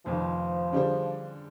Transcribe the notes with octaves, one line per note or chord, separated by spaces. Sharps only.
F1 F2 D#3 F3
D3 G3 D4 G#4 C5